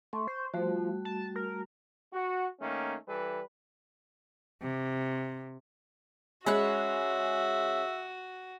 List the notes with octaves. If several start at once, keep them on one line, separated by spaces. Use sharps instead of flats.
A3 C6 C#6
C5
F3 G3 A3 F#4
A5
A#4
F#4
D#3 A3 A#3 C#4
E3 G3 A4 B4
C3
G#3 C#4 F#4 E5 B5 F#6